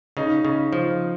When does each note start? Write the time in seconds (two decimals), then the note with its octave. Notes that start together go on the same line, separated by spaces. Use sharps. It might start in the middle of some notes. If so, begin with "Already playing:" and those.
0.17 C#3 D#4
0.45 C#3
0.73 F3